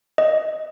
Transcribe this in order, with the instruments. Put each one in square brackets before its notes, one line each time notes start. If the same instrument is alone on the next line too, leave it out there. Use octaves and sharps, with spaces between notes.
[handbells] D#5